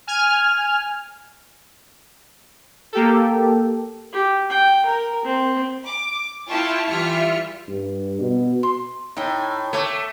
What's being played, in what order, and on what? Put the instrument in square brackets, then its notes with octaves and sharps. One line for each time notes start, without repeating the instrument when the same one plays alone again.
[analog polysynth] G#5 F6
A#3 G4 A4
[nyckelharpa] G4
G5
A#4
C4
[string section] D6
E4 F4 G5 A5 C#6
E3 G3 F4 E5 F6 C#7
[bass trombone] G2
B2
[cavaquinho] C6
[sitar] A2 [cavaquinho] D#4 G5
[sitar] A3 [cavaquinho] C#5 D6